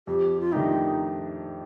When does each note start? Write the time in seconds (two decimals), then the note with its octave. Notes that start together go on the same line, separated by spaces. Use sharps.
0.07 F2 G4
0.40 F4
0.52 D#3 A3 D4 D#4 G4